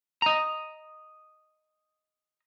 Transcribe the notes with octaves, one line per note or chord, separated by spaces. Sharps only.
D#5 A#5